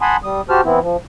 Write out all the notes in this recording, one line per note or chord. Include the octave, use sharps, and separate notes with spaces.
F#5 G#5 A5 B5 C6 D#6
G3 D#6
F#4 G4 C5 A5 F6
E3 B3 C4 E4
F3